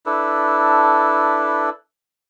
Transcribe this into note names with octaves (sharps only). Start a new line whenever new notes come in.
D4 E4 A4 B4